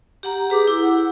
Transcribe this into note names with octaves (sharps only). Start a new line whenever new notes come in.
G4 F#5 A#5
G4 G#4 B4 D6
E4
F#5